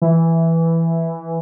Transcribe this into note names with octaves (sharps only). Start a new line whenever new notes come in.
E3